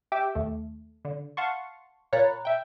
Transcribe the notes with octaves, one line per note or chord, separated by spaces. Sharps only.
G4 E5 G5 D6 E6
D#2 A3
D3
F5 F#5 A5 C6 C#6
A#2 C#5 A#5 B5 F#6 A6
E5 G5